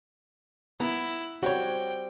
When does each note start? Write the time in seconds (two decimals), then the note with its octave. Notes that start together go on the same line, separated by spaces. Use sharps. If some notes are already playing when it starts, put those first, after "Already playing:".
0.80 B3 E4 A#5
1.43 G3 C4 F#4 C#5 G5